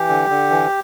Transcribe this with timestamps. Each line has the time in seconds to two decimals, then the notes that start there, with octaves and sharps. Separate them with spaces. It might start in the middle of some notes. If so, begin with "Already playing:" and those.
Already playing: E3 G4
0.09 D3
0.30 D3
0.50 E3